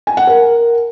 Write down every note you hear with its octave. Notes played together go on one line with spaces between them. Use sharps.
G#5
F#5
A#4